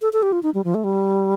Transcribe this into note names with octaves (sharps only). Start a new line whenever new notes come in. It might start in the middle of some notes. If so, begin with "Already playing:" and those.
A4
A4
G4
F4
D#4
G3
F3
A3
G3